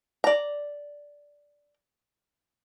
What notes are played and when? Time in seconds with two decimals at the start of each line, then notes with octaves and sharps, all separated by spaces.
0.24 D5 A#5